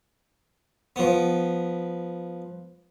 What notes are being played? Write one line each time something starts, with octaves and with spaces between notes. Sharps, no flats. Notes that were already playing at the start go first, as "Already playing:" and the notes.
F3 B3